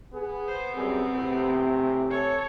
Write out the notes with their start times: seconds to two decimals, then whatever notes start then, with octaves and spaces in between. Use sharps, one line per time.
0.14 B3 G#4
0.48 C5
0.77 F#2 G3 C4 G#4
1.15 A2 C3
1.52 E3
2.10 A4 C#5